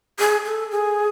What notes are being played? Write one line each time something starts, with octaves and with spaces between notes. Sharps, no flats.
G#4
A4
G#4